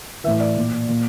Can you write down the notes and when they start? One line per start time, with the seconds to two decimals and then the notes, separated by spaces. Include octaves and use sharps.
0.24 E3 E5
0.28 A2
0.40 D5
0.57 A#2
0.88 A#2